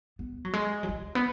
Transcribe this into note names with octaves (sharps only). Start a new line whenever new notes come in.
B3
F#3
G#3
F#3
G#3
B3